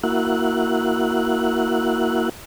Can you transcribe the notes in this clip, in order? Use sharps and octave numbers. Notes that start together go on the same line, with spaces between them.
A#3 E4 F#4 F#6